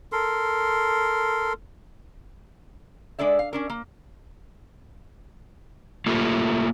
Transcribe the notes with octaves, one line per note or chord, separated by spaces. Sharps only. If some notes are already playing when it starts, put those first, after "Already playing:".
A4 A#4 C6
G#3 D4 A4 D5 E5
F5
C#4 D4 A#4
A#3
A3 A#3 F4 G4